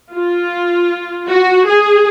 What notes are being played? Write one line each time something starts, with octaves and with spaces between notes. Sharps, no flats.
F4
F#4
G#4